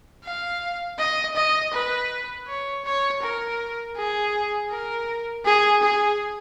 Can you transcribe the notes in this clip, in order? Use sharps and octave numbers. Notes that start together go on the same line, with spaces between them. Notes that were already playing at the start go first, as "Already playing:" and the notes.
F5
D#5
D#5
B4
C#5
C#5
A#4
G#4
A#4
G#4
G#4